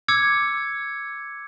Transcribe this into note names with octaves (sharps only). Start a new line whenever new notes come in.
D6 E6 G#6 C#7